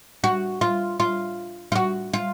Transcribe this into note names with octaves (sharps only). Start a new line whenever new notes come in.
F#4
F4
F4
F4
F#4
F4